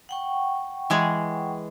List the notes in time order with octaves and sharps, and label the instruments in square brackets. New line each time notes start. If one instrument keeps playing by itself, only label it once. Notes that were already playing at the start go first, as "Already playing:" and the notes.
[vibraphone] F#5 G5 C#6
[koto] E3 G#3 G#4